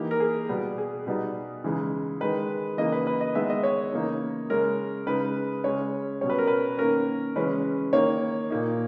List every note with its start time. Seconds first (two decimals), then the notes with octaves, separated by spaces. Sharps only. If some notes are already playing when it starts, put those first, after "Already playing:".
Already playing: E3 A#3 D#4 G4
0.11 A#4
0.20 G#4
0.49 B2 G3 B3
0.78 G#4
1.07 B2 G3 B3 D#4
1.64 C#3 E3 G#3 D#4
2.20 D#3 G#3 D#4 B4
2.77 C#3 E3 A#3 D#4 D#5
2.92 B4
3.07 B4
3.21 D#5
3.35 D#3 G#3 B3 D#4 E5
3.50 D#5
3.63 C#5
3.92 C#3 E3 A#3 D#4
4.50 C#3 G#3 C#4 A#4
5.07 C#3 G#3 D#4 B4
5.64 C#3 G#3 C#4 C#5
6.21 B2 G3 C#4 C#5
6.30 B4
6.39 A#4
6.47 B4
6.78 D#3 A#3 C#4 A#4
7.36 C#3 E3 G#3 C#4 B4
7.93 D#3 A#3 D#4 C#5
8.50 A#2 A#3 D#4